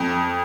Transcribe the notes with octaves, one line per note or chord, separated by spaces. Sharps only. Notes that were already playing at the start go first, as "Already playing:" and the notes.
Already playing: F2